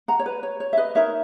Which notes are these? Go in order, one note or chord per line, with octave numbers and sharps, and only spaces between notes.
F#5 A#5
C#5
B4
C#5
C#5
E5
B4 D#5
D#4 A#4 C#5 E5